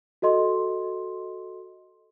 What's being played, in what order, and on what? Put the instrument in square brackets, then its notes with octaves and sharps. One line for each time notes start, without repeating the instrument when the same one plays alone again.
[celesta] F#4 A4 D#5 C6